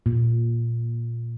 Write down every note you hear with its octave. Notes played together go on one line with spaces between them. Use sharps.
A#2